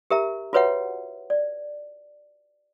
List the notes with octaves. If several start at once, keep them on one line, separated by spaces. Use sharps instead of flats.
G4 A#4 E5 A#5
F4 F#4 B4 C#5 E5 F#5
D5